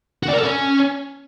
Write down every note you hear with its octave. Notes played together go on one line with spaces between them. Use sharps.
F#4
D5
A#4
A4
C#4